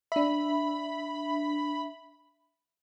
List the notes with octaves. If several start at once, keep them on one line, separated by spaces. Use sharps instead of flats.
D4 E5 B5